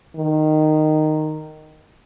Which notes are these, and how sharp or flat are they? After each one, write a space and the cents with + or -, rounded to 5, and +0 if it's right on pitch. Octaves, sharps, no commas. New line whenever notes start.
D#3 -10